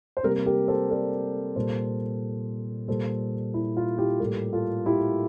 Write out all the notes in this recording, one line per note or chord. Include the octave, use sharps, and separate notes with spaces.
C5
C3 G3 A#3 G4 A#4
G4 A#4
A4 C5
A#4 D5
A#2 G3 A#3 A4 C5
A#2 G3 A#3 A4 C5
E4
F4
E4 G4
A2 G3 A#3 G4 A#4
F4 A4
E4 G4